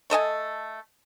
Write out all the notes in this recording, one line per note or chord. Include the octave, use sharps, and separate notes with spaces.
A3 A4 D#5 G#5